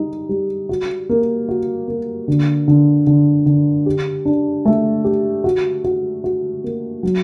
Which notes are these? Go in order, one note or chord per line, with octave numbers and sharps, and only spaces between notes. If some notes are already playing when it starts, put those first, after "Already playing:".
Already playing: G3 D#4
G3
F#4
A#3
F#4
A#3
D3
D3
D3
D3
G4
D4
A3
G4
F#4
F#4
F#4
A#3
F#3